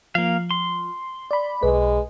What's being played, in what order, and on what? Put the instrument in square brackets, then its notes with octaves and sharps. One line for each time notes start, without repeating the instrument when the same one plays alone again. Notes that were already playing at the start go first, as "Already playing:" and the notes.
[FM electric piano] F3 [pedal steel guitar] A#3 F5
[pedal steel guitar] C6
[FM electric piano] D5 B5
[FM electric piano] B1 B4 [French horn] G#3